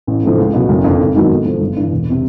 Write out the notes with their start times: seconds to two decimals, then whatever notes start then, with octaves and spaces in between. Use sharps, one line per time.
0.07 A1
0.23 A2 F3
0.38 C#2
0.53 B2 F#3 B3
0.69 F#1
0.84 F2 D3
0.99 G#1
1.15 G#2 D#3 F#3 B3
1.29 A2
1.45 F3 A3
1.61 G1
1.76 G2 E3
1.92 E1
2.10 C3